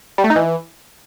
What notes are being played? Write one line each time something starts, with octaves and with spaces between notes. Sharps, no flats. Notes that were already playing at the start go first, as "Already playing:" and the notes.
G3
A3
D#4
E3